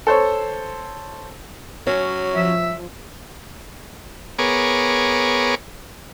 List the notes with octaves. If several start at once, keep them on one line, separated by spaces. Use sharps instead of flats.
A4 C5 C#5
F#3 C#4
F3 E5
B3 G#4 A#4 C#5 D6